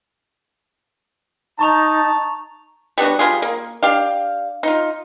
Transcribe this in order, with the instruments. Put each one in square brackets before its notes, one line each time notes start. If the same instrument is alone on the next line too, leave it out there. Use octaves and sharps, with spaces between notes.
[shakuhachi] D#4 [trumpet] A5 [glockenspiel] A#5 C#6 F7
[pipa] G3 B3 D4 F#4
G3 F4 G#4
A#3
D4 G4 F5
D#4 F4